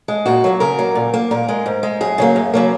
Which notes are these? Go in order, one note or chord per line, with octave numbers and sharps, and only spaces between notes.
G#3
A#2 F#4
F#3 A#3
C#3 A#4
F#3 A#3
A#2
A#3
A#2 A#4
G#3
G#2
G#3
F#2 G#4
C#3 F#3 A#3
F#2
C#3 F#3 A#3